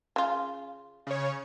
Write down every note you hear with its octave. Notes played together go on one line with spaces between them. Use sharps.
C#3 F4
C#3 C#5